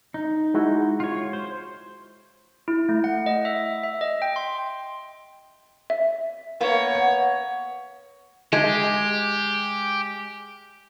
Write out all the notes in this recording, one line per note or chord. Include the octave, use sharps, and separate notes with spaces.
D#4
G#3 E4 F#4
F4 C#5
C5
E4
A3
F#5
D#5
E5
E5
D#5
G5
C6
E5
A#3 B3 C#5
F#5
G#3 G4